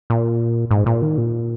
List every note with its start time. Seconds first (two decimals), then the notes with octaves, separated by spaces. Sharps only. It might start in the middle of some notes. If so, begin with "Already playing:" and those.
0.10 A#2
0.71 G#2
0.86 A#2
1.02 D#3
1.18 A#2